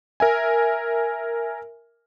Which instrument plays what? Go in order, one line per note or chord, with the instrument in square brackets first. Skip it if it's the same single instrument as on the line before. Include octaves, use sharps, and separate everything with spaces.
[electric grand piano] A#4 E5 G#5